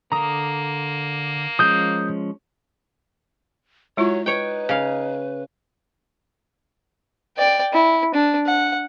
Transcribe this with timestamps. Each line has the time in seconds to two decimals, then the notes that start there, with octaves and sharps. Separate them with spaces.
0.12 D3 A#3 A#5 D#6
1.59 F3 G#3 C#4 D#6 G6
3.97 F#3 G#3 E4 F4 C#5
4.26 D#4 B4 C#5 G5
4.69 C#3 F5
7.37 D5 G5
7.73 E4
8.14 D4
8.47 F#5